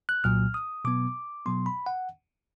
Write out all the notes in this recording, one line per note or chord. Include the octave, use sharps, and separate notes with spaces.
F#6
C2 A#2 F#3 F6
D#6
B2 F#3 B3 D6
B2 F#3 B3 C6
B5
F#5